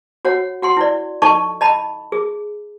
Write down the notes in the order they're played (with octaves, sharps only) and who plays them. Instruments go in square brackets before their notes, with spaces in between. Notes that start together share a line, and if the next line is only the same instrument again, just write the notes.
[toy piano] F#4 C#5 F#5
F#4 F#5 C6
E4 D5
D#4 A4 D#5 A5 C#6
D#5 A5 B5
G#4